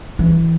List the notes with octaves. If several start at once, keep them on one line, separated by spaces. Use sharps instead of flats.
E3